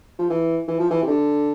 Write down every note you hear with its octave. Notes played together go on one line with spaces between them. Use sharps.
F3
E3
E3
F3
E3
C3
D3